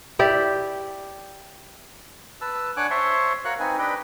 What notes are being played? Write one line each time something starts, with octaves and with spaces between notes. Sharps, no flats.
E4 G4 D5
B4 A5 E6
D4 C#5 F#5 G#5 D6 F#6
C5 C#5 E5 A5 C6 C#6
F#4 A#4 C#5 F5 C#6 F#6
C4 D#4 B4 G#5
D4 G4 B4 D#5 G5 B5